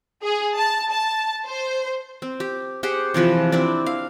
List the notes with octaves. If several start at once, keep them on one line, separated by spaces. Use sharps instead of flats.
G#4
A5
A5
C5
C4
G4
G4 G#4 C5 F#5
C3 E3 F3 B4
C4 D4 E4 D5
F5